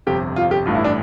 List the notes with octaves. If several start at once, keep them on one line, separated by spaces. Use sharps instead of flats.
G1 F2 C3 G4
F4
G4
A1 G2 E3 A3 F4
E4
D4